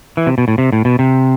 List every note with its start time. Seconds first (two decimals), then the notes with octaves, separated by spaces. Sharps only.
0.17 E3
0.27 C3
0.38 B2
0.48 A2
0.58 C3
0.72 A2
0.85 B2
0.99 C3